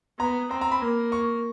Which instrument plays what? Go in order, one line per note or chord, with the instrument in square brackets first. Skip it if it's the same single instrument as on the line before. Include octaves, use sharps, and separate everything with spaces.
[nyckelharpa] B3 [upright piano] A#5
[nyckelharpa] C4 [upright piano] A#5
[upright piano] A#5
B5
[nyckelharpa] A#3
[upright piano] C#6